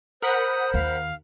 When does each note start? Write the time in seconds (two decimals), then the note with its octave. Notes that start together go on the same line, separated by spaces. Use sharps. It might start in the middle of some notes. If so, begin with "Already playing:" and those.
0.22 A#4 C5 F#5 B5 D#6
0.74 D#2 F5